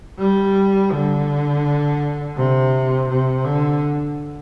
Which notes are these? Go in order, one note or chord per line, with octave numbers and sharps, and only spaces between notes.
G3
D3
C3
C3
D3